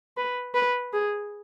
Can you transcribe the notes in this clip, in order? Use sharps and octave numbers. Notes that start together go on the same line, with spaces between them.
B4
B4
G#4